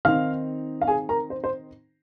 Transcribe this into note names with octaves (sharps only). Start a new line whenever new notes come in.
D#3 C4 D#4 F5 F6
F5
G#4 G#5
A#4 A#5
C5
C5